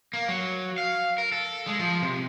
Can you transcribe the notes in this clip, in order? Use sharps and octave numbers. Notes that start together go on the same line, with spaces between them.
A#3
F#3
F5
A#4
A4
G#3
F3
C3